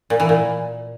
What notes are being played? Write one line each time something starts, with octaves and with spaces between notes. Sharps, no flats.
A#2
E3
A#2